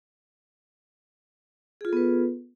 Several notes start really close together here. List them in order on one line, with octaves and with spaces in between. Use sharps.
G#4 F4 A4 B3 B4